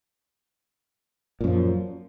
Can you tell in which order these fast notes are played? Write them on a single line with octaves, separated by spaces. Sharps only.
A#2 F#2 F3